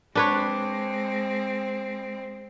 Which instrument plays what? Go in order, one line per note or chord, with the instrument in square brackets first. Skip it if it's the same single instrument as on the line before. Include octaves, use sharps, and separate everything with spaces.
[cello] G#3 C4 [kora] D4 B4 C#5